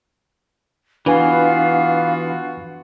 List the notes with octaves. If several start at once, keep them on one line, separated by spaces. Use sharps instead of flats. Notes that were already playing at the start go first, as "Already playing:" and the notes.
E3 B3 D4 F4 F#4 B4 F5 G#5